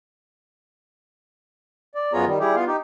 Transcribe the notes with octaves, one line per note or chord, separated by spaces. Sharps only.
D5
F#2 B3 F4 G#4 C#5 A#5
D#3 G3
G3 E4 G4 G#4
B3 F4 F5
D#4 G4